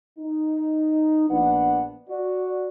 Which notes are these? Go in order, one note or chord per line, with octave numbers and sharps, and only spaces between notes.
D#4
A#1 B3 D4 F#5
F#4 D5